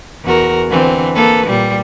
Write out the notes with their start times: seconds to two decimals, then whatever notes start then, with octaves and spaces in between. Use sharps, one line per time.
0.24 E2 F#4 A#4
0.69 D3 E3 C4
1.15 A#3 A4 B4
1.46 A#2 G3